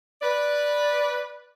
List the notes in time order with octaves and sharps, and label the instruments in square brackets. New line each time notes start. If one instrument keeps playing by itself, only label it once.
[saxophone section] B4 D5